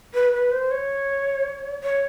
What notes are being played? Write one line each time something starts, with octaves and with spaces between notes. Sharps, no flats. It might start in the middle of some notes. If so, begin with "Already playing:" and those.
B4
B4
C5
C#5
C#5